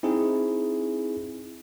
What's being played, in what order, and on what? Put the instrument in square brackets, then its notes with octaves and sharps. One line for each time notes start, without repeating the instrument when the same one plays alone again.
[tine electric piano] C4 D#4 E4 G#4